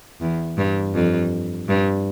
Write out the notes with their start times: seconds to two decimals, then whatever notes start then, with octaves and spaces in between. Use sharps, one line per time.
0.21 E2
0.58 G2
0.94 F2
1.68 G2